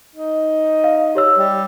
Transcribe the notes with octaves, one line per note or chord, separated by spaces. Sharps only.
D#4
F5
G4 C#5 E6
G3